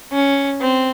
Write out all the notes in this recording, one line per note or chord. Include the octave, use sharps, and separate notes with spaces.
C#4
C4